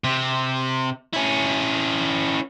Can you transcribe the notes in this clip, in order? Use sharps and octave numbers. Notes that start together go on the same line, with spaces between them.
C3
C#4 E4